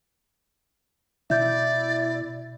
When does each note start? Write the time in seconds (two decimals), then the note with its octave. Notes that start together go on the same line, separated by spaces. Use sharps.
1.30 B2 E4 D5 E5 G6